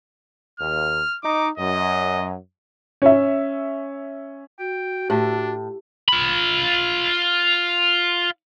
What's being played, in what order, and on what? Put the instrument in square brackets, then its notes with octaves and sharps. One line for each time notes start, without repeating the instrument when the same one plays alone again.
[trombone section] D#2 [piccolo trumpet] F6
[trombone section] D#4 [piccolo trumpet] D6
[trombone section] F#2 [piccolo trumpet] D#5
[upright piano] C#4 E5
[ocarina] F#4 [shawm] G5
[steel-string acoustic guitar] A2 [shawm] D4 [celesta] G4
[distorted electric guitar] F4 B5